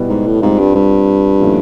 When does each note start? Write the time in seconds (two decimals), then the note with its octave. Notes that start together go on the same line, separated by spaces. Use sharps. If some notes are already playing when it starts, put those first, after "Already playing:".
Already playing: B2 G3 B3 E4
0.09 G#2
0.27 A2
0.42 G#2 G3 C4 F4
0.59 G2
0.75 G2
1.39 A#2 F3 A3 C#4 E4